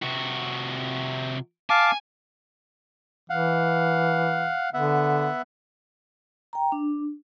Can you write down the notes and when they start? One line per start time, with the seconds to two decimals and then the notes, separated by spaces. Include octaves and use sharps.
0.03 C3 F#4
1.70 F5 G#5 A5 D6
3.30 E3 F5 F#5
4.74 D3 B3 E5 F#5
6.53 G5 A#5
6.72 D4